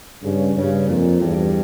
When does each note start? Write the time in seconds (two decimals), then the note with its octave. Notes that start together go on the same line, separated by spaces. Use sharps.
0.23 G2 C#3
0.56 G2 C#3
0.88 F2 A#2
1.21 E2 G2